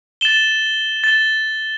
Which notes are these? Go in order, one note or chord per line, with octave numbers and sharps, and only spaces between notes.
A6 E7 G7
A6 E7 G7